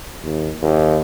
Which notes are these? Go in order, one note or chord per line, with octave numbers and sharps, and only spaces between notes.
D#2
D#2